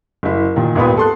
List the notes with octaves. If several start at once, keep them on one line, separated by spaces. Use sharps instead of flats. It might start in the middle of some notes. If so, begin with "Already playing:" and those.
F#1 E4
A#2 D#3 F4
G#1 D#2 A#2 B3 B5 D#6
A4 C6 F#6